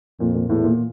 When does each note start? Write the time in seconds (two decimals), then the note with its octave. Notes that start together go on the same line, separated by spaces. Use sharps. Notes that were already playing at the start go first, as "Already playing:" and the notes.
0.20 F2 A#2
0.34 A#2
0.49 E2 A2
0.64 A#2